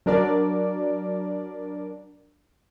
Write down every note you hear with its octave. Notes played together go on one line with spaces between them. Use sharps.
F#3 D4 A#4 D5